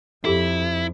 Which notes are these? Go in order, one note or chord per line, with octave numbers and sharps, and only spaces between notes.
F2 E4 G4 A4